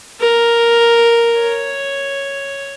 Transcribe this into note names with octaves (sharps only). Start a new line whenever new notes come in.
A#4
C#5